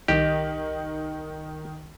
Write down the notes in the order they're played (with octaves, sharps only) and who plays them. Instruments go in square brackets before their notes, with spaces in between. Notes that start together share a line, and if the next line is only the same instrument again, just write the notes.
[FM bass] C2 [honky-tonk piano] D#3 [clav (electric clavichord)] G4 [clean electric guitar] D#5